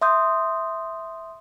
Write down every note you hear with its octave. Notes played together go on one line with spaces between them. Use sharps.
E5 C6 D#6 G6